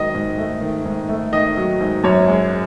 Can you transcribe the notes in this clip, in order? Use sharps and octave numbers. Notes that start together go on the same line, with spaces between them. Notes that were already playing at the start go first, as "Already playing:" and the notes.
Already playing: G#2 D#3 F#3 D#5
G#2
A3
D#3
G#2
A3
D#3 D#5
F#3
G#2
F#2 C#5
G#3